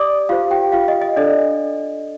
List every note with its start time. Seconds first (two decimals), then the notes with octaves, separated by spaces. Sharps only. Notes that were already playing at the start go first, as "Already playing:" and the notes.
Already playing: G4 D5 D6 D#6
0.29 F4 G4 C5 F5
0.51 G4 G5
0.72 F4 F5
0.88 D#5
1.02 D#5
1.16 D4 A4 D5 D#5